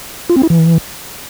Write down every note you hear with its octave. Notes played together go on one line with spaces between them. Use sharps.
F4
C4
E4
E3